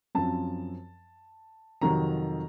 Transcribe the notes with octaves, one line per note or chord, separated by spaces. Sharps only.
F#2 F3 C4 A5
F2 C3 D#3 F#3 C4 A#5